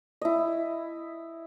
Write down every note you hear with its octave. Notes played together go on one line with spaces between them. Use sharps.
E4 D#5